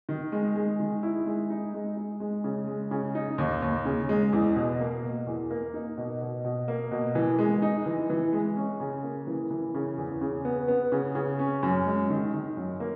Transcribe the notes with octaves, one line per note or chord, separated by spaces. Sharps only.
D#3
G#3
G#3
D#3
E4
G#3
D#4
G#3
D#4
G#3
C#3
G#3
C#3
D#4
D#2
D#2
C#3
G#3
E2
B2
A#3
B2
E2
A#3
D#4
B2
B2
B2
A#3
B2
E3
G#3
D#4
E3
E3
G#3
C#4
C#3
A#3
E3
E3
C#3
E2
C#3
B3
B3
C#3
C#3
C#4
F#2
G#3
D#3
D#3
F#2
A#3